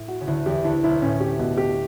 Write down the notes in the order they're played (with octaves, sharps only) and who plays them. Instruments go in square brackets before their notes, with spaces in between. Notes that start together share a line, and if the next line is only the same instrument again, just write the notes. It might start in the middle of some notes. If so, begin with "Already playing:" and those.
Already playing: [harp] A2
[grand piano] F#4
[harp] C#3
[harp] D2 D3 [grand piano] E4
[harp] E2 E3 [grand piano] G4
[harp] D2 D3 [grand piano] E4
[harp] B1 B2 [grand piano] E4
[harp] A2 [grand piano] C#4
[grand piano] G4
B2
G4